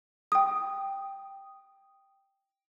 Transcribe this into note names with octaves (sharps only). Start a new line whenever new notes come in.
G5 D#6